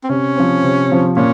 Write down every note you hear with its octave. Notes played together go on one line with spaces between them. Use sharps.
C4
C3 C#4
F3 C4
C3
F3 C4
A#2 C#4